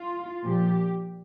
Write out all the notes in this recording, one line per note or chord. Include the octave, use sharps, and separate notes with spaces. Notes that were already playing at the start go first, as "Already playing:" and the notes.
Already playing: F4
A#2 F3 G4